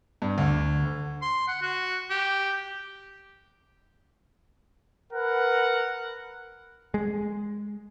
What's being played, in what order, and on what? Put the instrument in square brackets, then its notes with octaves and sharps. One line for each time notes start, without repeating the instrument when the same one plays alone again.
[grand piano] G2
D2
[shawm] C6
F#5
F#4
G4
[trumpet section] A#4 B4 F#5
[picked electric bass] G#3